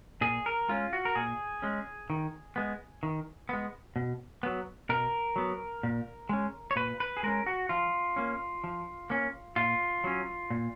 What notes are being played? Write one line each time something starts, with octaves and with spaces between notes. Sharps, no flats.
A#2 G#4
A#4
G#3 C#4 F4
F#4
A#4
A#2 G#4
G#3 C#4
D#3
G#3 B3
D#3
G#3 B3
B2
F#3 B3
B2 A#4
F#3 B3
A#2
G#3 C#4
C#5
A#2 B4
B4
G#4
G#3 C#4 A#4
F#4
F3 F4
A#3 C#4
F3
A#3 C#4
A#2 F4
F#3 C#4
A#2